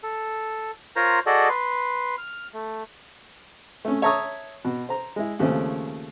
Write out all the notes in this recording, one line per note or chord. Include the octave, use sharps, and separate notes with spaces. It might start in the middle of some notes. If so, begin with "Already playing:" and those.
A4
F4 A#4 C5 C#5 A#5
F#4 G#4 A4 D5 D#5
B4 C6
F6
A3
A3 C#4
C#5 E5 A5 A#5 C#6 D#6
B2
C5 A#5
G#3 E4
D#2 C#3 F3 A3 C4 C#4